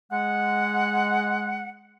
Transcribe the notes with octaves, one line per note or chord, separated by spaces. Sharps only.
G#3 F#5